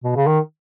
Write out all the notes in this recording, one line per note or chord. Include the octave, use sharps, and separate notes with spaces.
B2
C#3
D#3